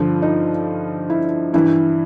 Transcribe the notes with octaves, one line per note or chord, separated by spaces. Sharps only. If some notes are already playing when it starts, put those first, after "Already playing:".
Already playing: G2 D3 F3 F4
D#4
E4
G2 E3 E4